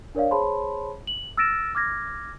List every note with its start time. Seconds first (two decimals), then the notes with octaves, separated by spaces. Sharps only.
0.15 D4 A#4 C#5 D5 F5
0.31 G#4 C5 C#5 A5 B5 C6
1.07 F#7
1.37 E6 F6 A6 A#6 D7 E7
1.75 D6 F6 G#6 A#6